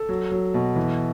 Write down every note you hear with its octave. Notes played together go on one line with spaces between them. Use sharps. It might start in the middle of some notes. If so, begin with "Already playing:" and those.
Already playing: A4
F#3
F#3
B2
E3